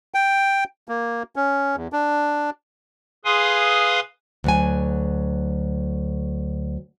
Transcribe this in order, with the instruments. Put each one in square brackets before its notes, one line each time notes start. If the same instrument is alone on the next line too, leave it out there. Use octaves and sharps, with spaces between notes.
[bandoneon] G5
A#3
C#4
E2
D4
[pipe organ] G#4 B4 F5 G#5 C6 D#6
[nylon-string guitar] D2 F#3 G#5